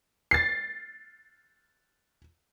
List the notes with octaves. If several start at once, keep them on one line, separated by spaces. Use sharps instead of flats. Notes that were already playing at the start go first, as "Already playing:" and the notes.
A6 C7